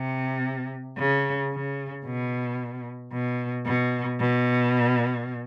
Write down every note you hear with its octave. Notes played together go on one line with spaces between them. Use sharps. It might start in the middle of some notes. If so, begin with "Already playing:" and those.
Already playing: C3
C#3
C#3
B2
B2
B2
B2